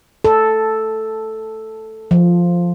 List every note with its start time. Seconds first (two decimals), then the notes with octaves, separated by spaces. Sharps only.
0.24 A4
2.11 F3